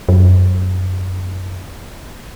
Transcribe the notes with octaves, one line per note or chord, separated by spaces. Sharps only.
F#2